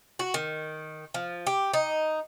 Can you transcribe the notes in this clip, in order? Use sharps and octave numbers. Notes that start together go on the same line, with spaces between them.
F#4
D#3
F3
G4
D#4